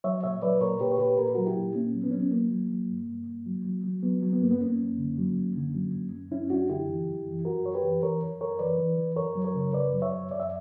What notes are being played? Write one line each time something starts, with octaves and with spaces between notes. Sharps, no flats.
F#3 C#5 E5
A#2 C#5 E5
F#3 B4 D5
A#2 A#4 C#5
A#2 G4 B4
C#5
A#2 G4 B4
A#2 A#4
B4
F#3 F#4 A#4
E4 G4
A#2
A#2 A#3 C#4
F#3
B3
F#3 C#4
B3
F#3 A#3
F#3
F#3
G2
G2
G2
F#3
F#3
F#3
F#3 B3
F#3
B3
G2 A#3
B3
F#2 A#3 C#4
F#2
D3
F#3
F#2
D3
F#3
F#2
F#2
F#2 C#4 E4
F#2 D4 F#4
D3 E4 G4
E3
F#2
E3
F#2 F#4 A#4
F#2 C#5
G4 B4
E3
E3 A#4 C#5
F#2
F#2 A#4 C#5
E3 B4 D5
E3
E3
F#2 A#4 C#5
F#3
A#4 C#5
C#3
F#2 B4 D5
F#3
C#5 E5
F#2
F#2 D5
E5